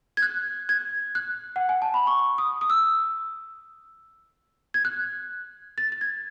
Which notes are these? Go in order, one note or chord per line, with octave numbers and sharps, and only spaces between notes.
G#6
F#6
G#6
F#6
F#5
G#5
A5
B5
C#6
D#6
D#6
E6
G#6
F#6
A6
A6
G#6